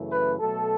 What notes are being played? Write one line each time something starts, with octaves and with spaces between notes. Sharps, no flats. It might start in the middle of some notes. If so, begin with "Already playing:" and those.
Already playing: F#2 C#3 E3 A3
B4
B2 F#3 A3 A4